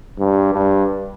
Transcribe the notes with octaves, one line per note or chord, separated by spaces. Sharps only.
G2
G2